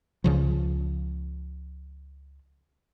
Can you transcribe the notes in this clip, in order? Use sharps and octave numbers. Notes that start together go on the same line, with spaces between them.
C#2 C#3 F3